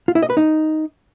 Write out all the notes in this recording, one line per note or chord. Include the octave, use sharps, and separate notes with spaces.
F4
E4
D#5
B4
D#4